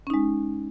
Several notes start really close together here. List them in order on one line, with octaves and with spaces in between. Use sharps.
C#4 D#4 G#3